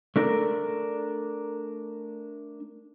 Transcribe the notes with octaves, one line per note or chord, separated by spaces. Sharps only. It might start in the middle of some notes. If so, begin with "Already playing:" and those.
A3 D4 A#4